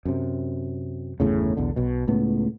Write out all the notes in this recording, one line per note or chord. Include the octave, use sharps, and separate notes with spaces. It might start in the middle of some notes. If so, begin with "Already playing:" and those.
F#2 C3
G1 E2 A2 C#3
B1 E2 D3
B1 B2
C#2 A2 B3